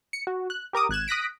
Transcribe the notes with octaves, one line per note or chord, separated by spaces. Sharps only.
C#7
F#4
F#6
G4 A#4 D6 D#6
G#1 F#6 G#6 E7
D#6 F#6 A#6 B6 D7